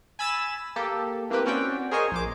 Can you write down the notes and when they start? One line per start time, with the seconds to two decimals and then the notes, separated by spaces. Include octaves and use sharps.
0.19 G#5 B5 E6 A6 B6 E7
0.76 A#3 G4 A4
1.30 E3 A#3 C4 G4 B4
1.45 C4 C#4 F#4 D5 G5
1.91 G#4 A#4 C5 C#5 D#5 G#5
2.11 A#1 C5 D6